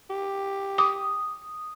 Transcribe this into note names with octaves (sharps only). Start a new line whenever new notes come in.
G4
D6 D#6